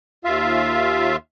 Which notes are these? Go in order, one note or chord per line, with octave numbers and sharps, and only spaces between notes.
D#2 F4 E5 F5